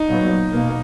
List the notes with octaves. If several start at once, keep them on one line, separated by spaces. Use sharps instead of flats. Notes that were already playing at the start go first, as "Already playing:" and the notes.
Already playing: D#4
A#2 F#3 B3
B2 A#3